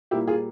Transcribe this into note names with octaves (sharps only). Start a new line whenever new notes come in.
A#2 G3 A#3 E4 G4
F4 G#4